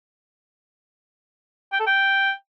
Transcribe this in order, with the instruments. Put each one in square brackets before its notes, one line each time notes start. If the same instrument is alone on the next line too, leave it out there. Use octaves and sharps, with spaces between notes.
[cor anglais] G5
A4
G5